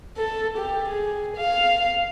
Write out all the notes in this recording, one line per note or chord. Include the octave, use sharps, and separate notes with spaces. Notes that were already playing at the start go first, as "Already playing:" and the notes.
A4
G4
G#4
F5